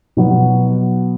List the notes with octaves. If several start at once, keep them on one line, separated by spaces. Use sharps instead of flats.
B2 F#3 B3 F#4